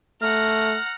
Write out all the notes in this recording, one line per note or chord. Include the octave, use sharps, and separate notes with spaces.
A3 F#5 A#5 F6